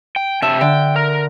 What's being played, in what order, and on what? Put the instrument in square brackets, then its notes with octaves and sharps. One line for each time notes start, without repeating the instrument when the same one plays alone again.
[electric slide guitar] G5
[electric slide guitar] C3 G4 A5 [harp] E5
[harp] D3 [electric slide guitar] G5
[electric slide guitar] A#4